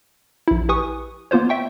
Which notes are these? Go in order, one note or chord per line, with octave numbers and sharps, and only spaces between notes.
A#1 E4
G4 B4 G#5 C#6 D#6
A#3 B3 F4 C5 C#5
E5 G5 C#6